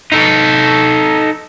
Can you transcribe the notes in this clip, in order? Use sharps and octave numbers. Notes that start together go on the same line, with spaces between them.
D#4 A4